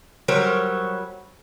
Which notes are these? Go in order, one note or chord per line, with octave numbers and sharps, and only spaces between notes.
F#3 G3 A#4 C5 C#5